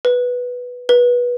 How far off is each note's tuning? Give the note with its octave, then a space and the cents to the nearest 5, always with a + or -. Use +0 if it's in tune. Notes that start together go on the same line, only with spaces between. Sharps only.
B4 -5
B4 -20